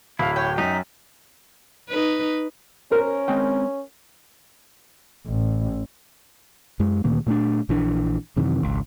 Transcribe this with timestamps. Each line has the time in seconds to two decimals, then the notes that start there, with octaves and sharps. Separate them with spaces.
0.19 D1 E4 F5
0.36 C#5 G5
0.58 F#2 D#4 B6
1.89 D#4 B4
2.92 C#4 A#4 C5
3.28 G#3 C4 G5
5.27 A1
6.80 F#2 G#3
7.04 D2 A#2 D#3 A#3
7.26 A#2 A3 C#4 D4
7.69 A#1 E3 D4
8.36 F#2 C3 D#3 E3
8.63 G#1 C#2